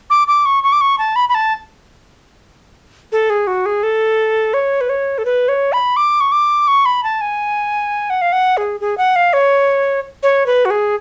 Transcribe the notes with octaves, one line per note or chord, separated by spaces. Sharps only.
D6
D6
C#6
C#6
D6
C#6
A5
B5
B5
A5
A4
G#4
F#4
G#4
A4
C#5
B4
C#5
A4
B4
C#5
B5
D6
C#6
D6
C#6
B5
A5
G#5
F#5
F5
F#5
G#4
G#4
F#5
F5
C#5
C#5
B4
F#4
G#4